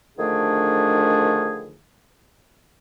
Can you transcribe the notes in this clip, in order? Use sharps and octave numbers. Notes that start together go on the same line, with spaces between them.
D3 D#3 F3 A3 D4 G#4